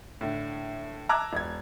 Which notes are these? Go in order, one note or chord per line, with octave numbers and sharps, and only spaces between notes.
A2 D3
A5 A#5 D6 E6 F#6 G#6
E1 G#6